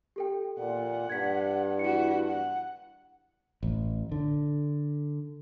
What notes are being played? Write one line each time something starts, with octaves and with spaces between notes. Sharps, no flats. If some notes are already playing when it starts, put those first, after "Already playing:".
G4 A4 G5
A#2 F#5
G2 G#6 B6
E4 F#4 C#7
F#5
A1
D3